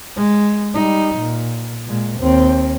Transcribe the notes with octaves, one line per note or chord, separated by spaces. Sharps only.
G#3
G3 D#4
A#2
A#2 G#3
D#2 C4